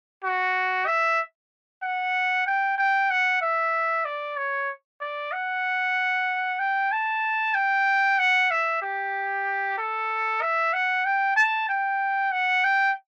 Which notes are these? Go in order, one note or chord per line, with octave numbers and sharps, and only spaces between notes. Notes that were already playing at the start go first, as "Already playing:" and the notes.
F#4
E5
F#5
G5
G5
F#5
E5
D5
C#5
D5
F#5
G5
A5
G5
F#5
E5
G4
A4
E5
F#5
G5
A5
G5
F#5
G5